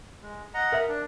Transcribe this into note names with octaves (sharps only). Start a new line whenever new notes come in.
G#3
D#5 F#5 A#5
A#4 E5
D4